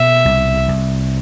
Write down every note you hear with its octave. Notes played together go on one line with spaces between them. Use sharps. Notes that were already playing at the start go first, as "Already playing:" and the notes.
Already playing: B2 E5
C2
C2